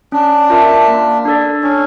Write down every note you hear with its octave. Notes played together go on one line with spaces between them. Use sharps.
C#4 D4
F4 A#4 E5 A5
A#3
D4 A4 D5
C#4 D4